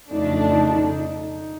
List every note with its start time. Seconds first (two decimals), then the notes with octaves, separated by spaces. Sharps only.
0.11 F2 C#3 F3 A3 D4 D#4
0.32 D#4
0.51 D#4
0.71 D#4